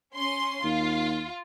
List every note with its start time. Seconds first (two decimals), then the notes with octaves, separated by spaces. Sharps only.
0.16 C#4 C6
0.63 D#2 F4